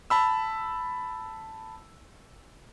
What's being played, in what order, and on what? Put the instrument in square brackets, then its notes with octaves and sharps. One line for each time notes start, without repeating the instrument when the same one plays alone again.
[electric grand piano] A5 B5 E6